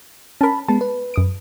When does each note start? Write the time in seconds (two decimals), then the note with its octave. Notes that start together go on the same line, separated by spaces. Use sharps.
0.41 C#4 A#4 A5 B5
0.68 G#3 B3 A5
0.81 B4
1.14 F#2 D#6 D7